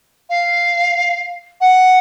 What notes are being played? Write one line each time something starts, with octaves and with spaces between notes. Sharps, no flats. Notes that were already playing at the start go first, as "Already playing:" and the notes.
F5
F#5